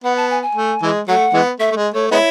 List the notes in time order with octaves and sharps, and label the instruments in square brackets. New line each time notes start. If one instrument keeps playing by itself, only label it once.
[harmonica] B3 [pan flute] F#5
[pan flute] A5
G#5
G#5
[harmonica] A3
E3 G#3
[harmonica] F#3 A3 [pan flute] F#5
[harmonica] E3 G#3 B3
[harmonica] A3 [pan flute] E5
[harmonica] A3
G#3
[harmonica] A3 [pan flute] C#5
[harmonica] G#3 B3 E4 [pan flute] C#5